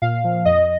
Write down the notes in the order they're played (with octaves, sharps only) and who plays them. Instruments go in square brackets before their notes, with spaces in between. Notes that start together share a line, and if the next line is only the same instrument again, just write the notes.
[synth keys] A#2 F5
F3
F2 D#5